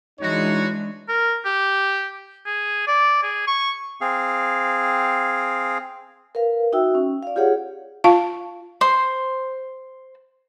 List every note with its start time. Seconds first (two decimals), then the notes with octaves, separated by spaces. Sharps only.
0.20 E3 G#3 D4 D#4 F#4 C#5
1.09 A#4
1.45 G4
2.46 G#4
2.87 D5
3.23 G#4
3.47 C#6
4.01 C4 G#4 F5
6.35 A#4 B4 F5
6.73 D#4 F#4 E5 G5 E6
6.95 C#4
7.23 D5 F5
7.36 F4 G4 G#4 C#5 F#5
8.04 F4 F5 A5
8.81 C5 C6